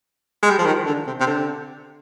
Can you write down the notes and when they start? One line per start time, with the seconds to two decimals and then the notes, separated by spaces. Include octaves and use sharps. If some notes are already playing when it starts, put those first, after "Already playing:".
0.43 G#3
0.50 G3
0.58 F3
0.66 D#3
0.86 D3
1.07 C3
1.21 C3
1.27 D3